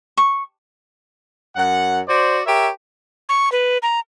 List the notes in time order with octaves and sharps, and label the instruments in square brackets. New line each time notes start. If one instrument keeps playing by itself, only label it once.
[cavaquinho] C#6
[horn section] F#2 F#5
F#4 C5 D5
G4 A#4 C#5 E5
[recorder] C#6
B4
A#5